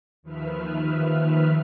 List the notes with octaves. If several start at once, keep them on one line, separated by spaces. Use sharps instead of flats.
D#2 D#3 F3 B4 E5 F6